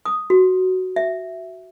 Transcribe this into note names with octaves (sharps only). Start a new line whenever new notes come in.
D#6
F#4
E5